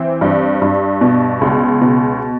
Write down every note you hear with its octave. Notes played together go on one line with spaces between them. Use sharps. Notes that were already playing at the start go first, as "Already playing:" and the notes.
Already playing: E3 C4
G2
G2
B2
C#2
B2